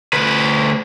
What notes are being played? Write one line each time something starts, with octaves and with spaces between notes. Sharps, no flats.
D2 B4